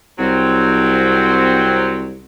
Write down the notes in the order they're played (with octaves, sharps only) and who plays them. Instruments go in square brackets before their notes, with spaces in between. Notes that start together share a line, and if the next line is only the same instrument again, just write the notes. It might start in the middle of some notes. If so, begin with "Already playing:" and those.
[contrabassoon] C2 [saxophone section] F#3 C4